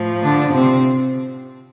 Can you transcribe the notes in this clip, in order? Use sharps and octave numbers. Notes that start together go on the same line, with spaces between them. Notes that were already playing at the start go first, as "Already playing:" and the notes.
Already playing: A2 F3
D3 D4
C3 C4